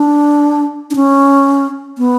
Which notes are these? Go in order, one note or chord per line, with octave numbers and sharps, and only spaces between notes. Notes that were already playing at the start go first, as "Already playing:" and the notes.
Already playing: D4
D4
C#4
B3